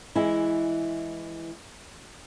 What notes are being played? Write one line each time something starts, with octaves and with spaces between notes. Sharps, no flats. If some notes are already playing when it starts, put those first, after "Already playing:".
E3 G#3 E4